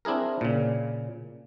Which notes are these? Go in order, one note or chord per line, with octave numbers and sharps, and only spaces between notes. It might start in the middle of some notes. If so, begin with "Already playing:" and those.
C4 D4 E4 G#4 A#4
A#2 C#3